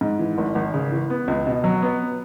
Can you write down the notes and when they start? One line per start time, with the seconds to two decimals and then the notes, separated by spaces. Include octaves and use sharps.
0.01 G#2
0.19 E3
0.38 G#1
0.55 G#1
0.74 C#3
0.92 E3
1.10 B3
1.28 C#2
1.47 B2
1.64 F#3
1.82 B3